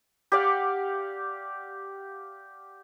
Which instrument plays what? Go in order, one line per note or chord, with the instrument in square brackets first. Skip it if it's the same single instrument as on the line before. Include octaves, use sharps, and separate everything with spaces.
[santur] G4 D5 F5 F#5